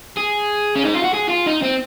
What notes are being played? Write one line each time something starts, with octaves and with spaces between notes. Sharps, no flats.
G#4
C#4
D#4
F4
F#4
G#4
F4
D#4
C4